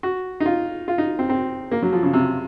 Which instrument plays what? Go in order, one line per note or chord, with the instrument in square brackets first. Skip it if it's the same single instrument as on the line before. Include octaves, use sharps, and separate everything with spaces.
[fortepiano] F#4
D#4
F4
F4
D#4
C4
C4
A#3
F#3
F3
C#3
C3